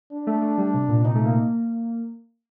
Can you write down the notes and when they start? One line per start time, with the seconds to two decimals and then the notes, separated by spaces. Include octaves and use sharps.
0.11 D4
0.27 A3
0.42 A3
0.58 G3
0.74 C3
0.89 A#2
1.04 C3 D#4
1.15 A3
1.25 A#3